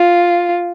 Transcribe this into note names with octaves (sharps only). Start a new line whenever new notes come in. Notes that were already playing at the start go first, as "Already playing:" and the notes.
Already playing: F4